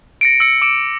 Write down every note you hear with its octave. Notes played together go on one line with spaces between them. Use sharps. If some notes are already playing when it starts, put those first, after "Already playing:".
A#6 C#7 D7
E6 C#7
D6 D7 E7